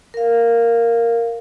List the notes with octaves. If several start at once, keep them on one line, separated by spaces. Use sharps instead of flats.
A#4 F5